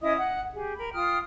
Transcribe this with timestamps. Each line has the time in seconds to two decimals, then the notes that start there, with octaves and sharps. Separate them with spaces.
0.02 C#4 E4 D#5 D#6
0.18 F#5
0.53 G4 G#4
0.76 A#4 B5
0.94 F4 G5 D#6 F6